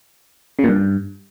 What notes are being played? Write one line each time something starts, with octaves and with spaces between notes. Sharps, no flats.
C#3
A#2
G2